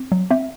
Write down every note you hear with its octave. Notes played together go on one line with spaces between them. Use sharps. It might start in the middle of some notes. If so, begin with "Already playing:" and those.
Already playing: C4
F#3
C4 E5